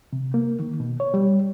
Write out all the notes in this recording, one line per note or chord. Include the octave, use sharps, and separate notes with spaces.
C3
A#3
D#3
B2
C#5
G3